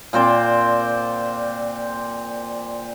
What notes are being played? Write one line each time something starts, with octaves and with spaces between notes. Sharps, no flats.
A#2 C4 C5 D5